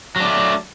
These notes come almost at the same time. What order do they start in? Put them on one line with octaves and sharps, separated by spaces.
F#3 D4 A3